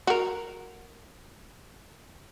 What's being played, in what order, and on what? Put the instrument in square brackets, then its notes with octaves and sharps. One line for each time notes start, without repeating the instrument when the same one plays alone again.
[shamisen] F#4 A#4